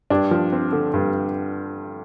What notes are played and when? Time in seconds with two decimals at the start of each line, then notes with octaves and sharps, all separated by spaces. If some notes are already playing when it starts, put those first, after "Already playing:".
0.10 G2 D4
0.31 F3
0.52 C4
0.73 D3
0.94 G2